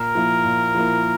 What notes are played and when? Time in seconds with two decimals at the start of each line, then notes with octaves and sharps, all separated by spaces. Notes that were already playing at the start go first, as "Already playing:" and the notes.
Already playing: A#2 A#4
0.15 F3 A#3 E4
0.45 A#2
0.74 F3 A#3 E4